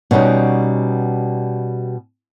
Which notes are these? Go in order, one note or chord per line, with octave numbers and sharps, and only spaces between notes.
B2 G3 C#4 D#4